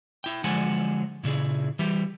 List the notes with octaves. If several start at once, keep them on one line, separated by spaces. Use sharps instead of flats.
E4 G5
D3 F3 F#3 G#3 F#5 G#5
A#2 C#3 E4 G#4
E3 G3 G4